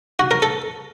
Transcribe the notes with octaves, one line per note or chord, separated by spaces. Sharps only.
F#4
A#4
A4